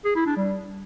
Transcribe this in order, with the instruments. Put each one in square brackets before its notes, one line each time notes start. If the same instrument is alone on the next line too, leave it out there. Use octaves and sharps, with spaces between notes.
[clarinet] G#4
E4
D4
G3